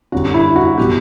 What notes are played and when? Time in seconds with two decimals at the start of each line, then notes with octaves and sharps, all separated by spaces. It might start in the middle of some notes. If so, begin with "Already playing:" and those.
0.12 F#2 D3 G3 F#4
0.34 E4
0.56 F#4
0.77 B2 F#3 G4